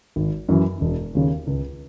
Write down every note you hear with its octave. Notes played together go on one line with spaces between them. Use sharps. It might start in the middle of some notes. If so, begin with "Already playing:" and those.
G#1
F#2 E3
E1
D#2 C#3
C#2